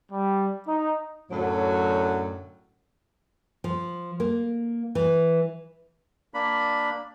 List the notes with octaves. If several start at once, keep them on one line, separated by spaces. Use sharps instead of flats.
G3
D#4
F#2 A2 D3 F#3
F3
A#3
E3
A#3 D4 B5